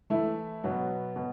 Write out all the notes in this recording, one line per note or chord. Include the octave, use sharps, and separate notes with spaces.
E3 A3 E4
B2 F#3 B3
B2